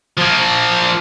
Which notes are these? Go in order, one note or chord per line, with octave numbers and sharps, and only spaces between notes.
F3 A#3